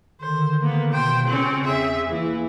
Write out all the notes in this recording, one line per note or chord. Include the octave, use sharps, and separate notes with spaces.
D3 D#3 C5
A#3 B3
B2 C5 G5
C#3 C4 C#4
E2 G#4 E5
E3 A#3